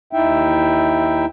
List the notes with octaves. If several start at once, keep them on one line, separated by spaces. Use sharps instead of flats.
D#2 D#4 E4 E5 G5